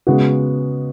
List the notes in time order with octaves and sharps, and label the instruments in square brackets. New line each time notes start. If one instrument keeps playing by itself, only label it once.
[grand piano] C#3 G#3 B3 F#4